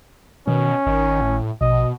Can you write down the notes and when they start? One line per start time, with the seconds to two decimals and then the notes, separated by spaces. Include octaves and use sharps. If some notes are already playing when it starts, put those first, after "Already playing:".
0.47 B2 D#3 C#4
0.86 G#1 D#3
1.21 A2
1.61 A#1 B2 D#5